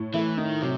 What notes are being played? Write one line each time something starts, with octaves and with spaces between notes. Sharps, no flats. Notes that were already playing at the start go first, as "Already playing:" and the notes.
Already playing: A2
E3 A3
D#3 D#4
C3 F#3